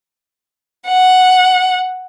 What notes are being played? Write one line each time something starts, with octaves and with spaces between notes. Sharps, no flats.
F#5